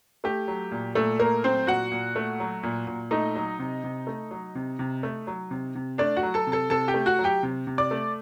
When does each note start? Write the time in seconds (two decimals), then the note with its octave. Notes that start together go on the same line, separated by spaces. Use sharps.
0.24 A3 G4
0.48 F#3
0.71 A#2
0.95 A#2 A3 A4
1.19 A3 A#3 A#4
1.44 F#3 C4 C5
1.67 A#2 F#4 F#5
1.92 A#2
2.16 A3
2.40 F#3
2.63 A#2
2.87 A#2
3.11 A3 D#4 D#5
3.35 F#3
3.59 C3
3.84 C3
4.07 A3
4.31 F#3
4.55 C3
4.79 C3
5.03 A3
5.27 F#3
5.51 C3
5.75 C3
5.98 A3 D4 D5
6.17 F#4 F#5
6.23 F#3
6.34 A4 A5
6.47 C3
6.52 A4 A5
6.70 C3 A4 A5
6.88 G4 G5
6.94 A3
7.06 F#4 F#5
7.19 F#3
7.24 G4 G5
7.43 C3
7.67 C3
7.78 D5 D6
7.91 A3